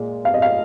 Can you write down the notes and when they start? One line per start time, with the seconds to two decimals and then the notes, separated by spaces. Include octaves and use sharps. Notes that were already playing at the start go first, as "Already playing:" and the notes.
Already playing: A#2 G#3
0.25 F5
0.34 D#5
0.42 F5